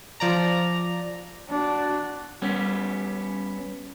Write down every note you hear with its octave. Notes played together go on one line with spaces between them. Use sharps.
F3 D5 A#5
D4 F#4
G3 B3 C#4